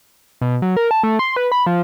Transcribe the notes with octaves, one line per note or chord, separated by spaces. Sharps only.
B2
F#3
A#4
A5
A3
C6
B4
B5
F3